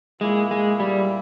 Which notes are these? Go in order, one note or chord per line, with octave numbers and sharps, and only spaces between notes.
A#2 G#3 A#3 E4
G#3
G3